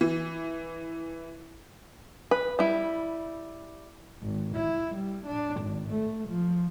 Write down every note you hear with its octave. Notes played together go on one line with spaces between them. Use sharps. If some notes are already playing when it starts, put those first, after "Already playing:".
E3
B4
G3 E4
G#1
E4
G3
D4
G#1
A3
F3